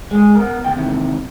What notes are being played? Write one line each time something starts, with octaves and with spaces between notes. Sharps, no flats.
G#3 G#4
B3 A#4
D2 G5
D#2 C3 E3